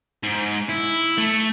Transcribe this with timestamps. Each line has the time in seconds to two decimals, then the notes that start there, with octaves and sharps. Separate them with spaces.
0.23 G#2
0.69 E4
1.18 A3